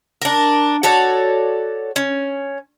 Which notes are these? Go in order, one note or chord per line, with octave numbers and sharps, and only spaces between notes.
D4 A#4
F#4 A4 C#5 D5
C#4